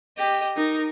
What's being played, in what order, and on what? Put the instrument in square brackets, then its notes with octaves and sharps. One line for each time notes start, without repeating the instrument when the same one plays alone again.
[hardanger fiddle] G4 D#5
[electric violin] D#4 [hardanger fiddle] A#4